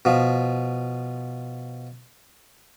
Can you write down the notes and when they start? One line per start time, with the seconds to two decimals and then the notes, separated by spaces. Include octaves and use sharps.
0.05 B2 F3